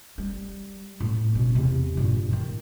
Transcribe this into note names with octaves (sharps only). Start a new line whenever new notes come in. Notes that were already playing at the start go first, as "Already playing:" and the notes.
G3
A2
B2 C#4
E2 C3
G2 A#2
D#3 E4